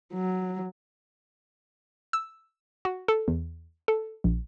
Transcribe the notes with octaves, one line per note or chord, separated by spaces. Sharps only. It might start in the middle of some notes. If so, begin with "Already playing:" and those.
F#3
E6
F#4
A4
E2
A4
A#1